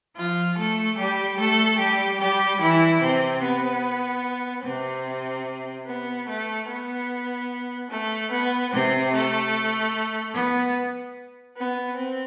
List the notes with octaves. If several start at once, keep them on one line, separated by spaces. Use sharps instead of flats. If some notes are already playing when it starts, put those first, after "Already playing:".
F3 F4
A3 A4
G3 G4
A3 A4
G3 G4
G3 G4
E3 E4
C3 C4
B3
C3 C4
B3
A3
B3
A3
B3
C3 C4
A3
B3
B3
C4